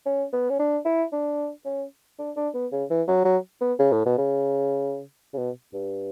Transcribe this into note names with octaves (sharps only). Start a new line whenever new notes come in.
C#4
B3
C#4
D4
E4
D4
C#4
D4
D4
B3
C#3
E3
F#3
F#3
B3
C#3
A2
B2
C#3
C#3
B2
G2